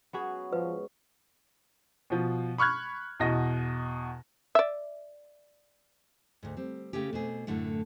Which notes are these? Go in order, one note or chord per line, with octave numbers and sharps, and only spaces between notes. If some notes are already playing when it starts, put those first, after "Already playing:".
F#3 B3 C#4 E4 F#4 G#4
G#2 F3 B4
B2 F3
B5 C#6 F6 F#6 G#6
E2 B2 D#5 A#6
D5 E5
D2 G#2
G3 C4
C#3 A3 C#4 G4
B2 C4 G#4
F#2 A2 D3 A3 F#5